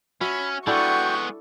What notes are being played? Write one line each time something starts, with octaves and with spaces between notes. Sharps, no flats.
C#4 F#4 E5 B5
G#3 B3 D4 E4 F#4 A4 G5 C#6